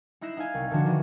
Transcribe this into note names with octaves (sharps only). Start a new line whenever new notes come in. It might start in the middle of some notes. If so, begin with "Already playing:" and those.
D#4 E4 F#6 A#6 C7 E7
D#4 F5 G#5
C2
D3 D#3 F3 D4 F#4
D#3 E3